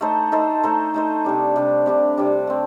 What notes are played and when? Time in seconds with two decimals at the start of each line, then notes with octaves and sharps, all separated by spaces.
0.01 A3 D#4 A4 C5
0.32 A3 D#4 A4 C5
0.63 A3 D#4 A4 C5
0.94 A3 D#4 A4 C5
1.25 C3 G3 D4
1.56 C3 G3 D4
1.86 C3 G3 D4
2.17 C3 G3 D4
2.47 A3 C4